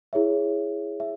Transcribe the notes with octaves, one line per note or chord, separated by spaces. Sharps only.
E4 G#4 C#5 E5
E5